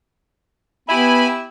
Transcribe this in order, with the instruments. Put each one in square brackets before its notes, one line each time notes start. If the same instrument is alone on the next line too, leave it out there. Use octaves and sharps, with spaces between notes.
[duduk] B3 [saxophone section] E4 G4 E5 [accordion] G#5 B5